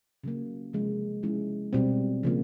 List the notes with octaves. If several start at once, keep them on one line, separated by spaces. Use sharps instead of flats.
C#3 F#3 A#3
C3 F3 G#3 C#4
F3 G#3 C#4 E4
B2 G3 C4
C#3 F3 A#3